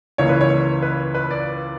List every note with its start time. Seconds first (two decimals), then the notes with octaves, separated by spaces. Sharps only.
0.18 C#2 C#3 E3 A#3 C#5
0.29 B4
0.41 C#5
0.82 B4
1.14 B4
1.31 D5